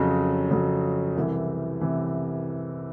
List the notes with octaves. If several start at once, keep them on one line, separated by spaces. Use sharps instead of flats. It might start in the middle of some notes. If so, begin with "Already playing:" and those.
Already playing: F2 C#3 F#3
F2 C#3 F#3
C2 C3 E3
C3 E3